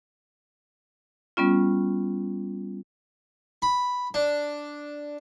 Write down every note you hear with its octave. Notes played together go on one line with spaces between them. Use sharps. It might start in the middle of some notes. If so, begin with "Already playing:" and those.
G3 B3 C#4 F4
B5
D4